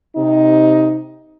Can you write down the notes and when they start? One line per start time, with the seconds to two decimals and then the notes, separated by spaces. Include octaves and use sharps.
0.16 C3 D#4